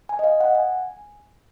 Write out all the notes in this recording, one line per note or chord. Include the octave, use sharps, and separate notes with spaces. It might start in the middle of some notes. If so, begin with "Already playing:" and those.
G#5
D#5
F5
F#5
G#5